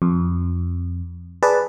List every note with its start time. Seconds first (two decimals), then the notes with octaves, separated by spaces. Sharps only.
0.02 F2
1.43 G#4 B4 D5 A5